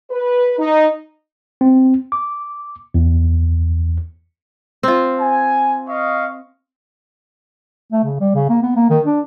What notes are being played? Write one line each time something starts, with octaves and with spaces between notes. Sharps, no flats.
B4
D#4
C4
D6
E2
C4 F4
G#5
D#5 F5 C#6
A3
C#3
G3
C#3
A#3
B3
A#3
D#3
D4